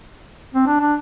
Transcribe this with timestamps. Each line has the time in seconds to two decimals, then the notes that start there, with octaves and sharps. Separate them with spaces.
0.54 C4
0.67 D4
0.80 D4